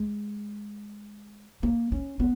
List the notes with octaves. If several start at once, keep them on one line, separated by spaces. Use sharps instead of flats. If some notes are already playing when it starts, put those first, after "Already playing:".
Already playing: G#3
A#3
C#4
B3